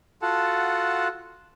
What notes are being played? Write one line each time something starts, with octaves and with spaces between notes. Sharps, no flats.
F4 F#4 A4 F#5 A5